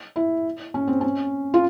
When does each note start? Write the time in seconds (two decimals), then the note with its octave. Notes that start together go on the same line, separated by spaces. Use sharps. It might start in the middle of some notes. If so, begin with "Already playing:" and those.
0.16 E4
0.74 C#4
0.88 C4
1.01 C#4
1.54 F4